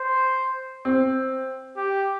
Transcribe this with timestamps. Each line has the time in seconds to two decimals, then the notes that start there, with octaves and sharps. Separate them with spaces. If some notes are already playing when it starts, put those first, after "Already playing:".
Already playing: C5
0.85 C4
1.77 G4